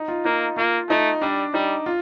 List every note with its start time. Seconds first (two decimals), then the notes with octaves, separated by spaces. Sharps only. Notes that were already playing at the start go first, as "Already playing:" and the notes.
Already playing: D#4
0.08 F4
0.25 A#3 D#4
0.57 A#3 F4
0.89 A3 D#4
1.21 G3 D4
1.54 G3 D#4
1.86 F4